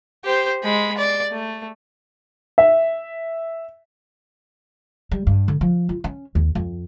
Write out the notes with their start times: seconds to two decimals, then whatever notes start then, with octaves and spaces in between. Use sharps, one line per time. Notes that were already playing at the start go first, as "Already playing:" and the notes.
0.25 G4 C5
0.64 G#3 B5
0.98 D5
1.32 A3
2.58 E5
5.11 G3
5.27 G2
5.48 D3
5.61 F3
5.89 F4
6.04 C#4
6.35 D#2
6.55 F2